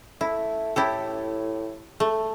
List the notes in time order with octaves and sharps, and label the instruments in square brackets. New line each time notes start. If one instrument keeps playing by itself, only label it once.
[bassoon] A3 [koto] E4
[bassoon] A2 [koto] E4 G4 A4
[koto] A3